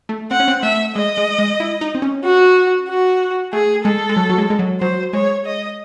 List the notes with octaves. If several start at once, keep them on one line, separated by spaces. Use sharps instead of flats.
A3
C4 F#5
C#4
C4
A3 E5
G#3 D#5
G#3
G#3
E4
D#4
C4
C#4
F#4
F#4
A3 G#4
G#3 A4
G#3
F#3
F#3
G#3
G#3
F#3
F#3 C5
G#3 C#5
D#5